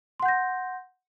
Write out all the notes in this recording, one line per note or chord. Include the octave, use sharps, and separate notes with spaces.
F#5 C6 G6 A#6